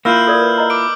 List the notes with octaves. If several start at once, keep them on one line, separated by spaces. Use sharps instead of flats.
A#3 E4 F4 E6 F6 G6
A4 A#4 D5
B4
D#5 A#5
D6 D7